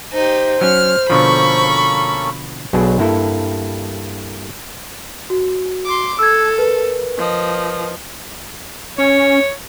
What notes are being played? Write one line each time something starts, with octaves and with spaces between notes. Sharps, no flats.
D#4 G4 C5
F#3 C#4 F6
B2 D3 F3 A#3 C#4 A4 B5 C#6
B1 B2 F#3 D4 G#4
G2 A#3 E4 A4
F#4
C6 D6
A4 E6 G#6
A#4 B4
F3 D#5
C#4 C#5